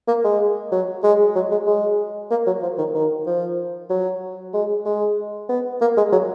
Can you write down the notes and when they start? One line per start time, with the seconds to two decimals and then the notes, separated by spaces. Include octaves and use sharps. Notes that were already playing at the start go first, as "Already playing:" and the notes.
0.08 A#3
0.24 G#3
0.72 F#3
1.03 G#3
1.35 F#3
1.51 G#3
1.67 G#3
2.31 A#3
2.47 F#3
2.62 F3
2.78 D#3
2.94 D#3
3.26 F3
3.90 F#3
4.54 G#3
4.85 G#3
5.49 B3
5.81 A#3
5.97 G#3
6.12 F#3